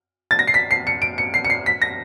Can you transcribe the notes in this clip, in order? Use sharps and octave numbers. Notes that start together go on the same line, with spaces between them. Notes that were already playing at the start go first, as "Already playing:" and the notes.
A6
A#6
C7
B6
C7
C#7
D7
C#7
C7
C#7
C7
B6
A#6